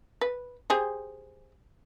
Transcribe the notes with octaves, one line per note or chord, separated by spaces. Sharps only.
B4
G4 G#4 C5